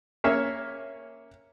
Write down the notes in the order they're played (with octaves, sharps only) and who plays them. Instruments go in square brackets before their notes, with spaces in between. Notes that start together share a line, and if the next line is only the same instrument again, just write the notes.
[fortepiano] A#3 C#4 C#5 E5